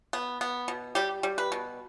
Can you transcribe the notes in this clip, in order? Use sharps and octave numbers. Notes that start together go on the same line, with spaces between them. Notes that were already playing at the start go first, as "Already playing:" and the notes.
B3
B3
B2
G3 G4
G3
B4
B2